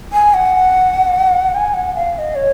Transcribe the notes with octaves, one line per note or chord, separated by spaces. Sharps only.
G#5
F#5
G#5
F#5
F5
F5
D#5
C#5